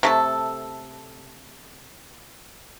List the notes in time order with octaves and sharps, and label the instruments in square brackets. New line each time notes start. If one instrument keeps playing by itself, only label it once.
[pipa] C3 A3 A4